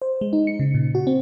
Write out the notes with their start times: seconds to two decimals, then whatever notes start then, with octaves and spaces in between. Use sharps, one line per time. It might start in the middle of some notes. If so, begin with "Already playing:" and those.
0.02 C5
0.21 G#3
0.33 D#4
0.47 C#7
0.60 C#3
0.74 A#2
0.95 F#4
1.07 C4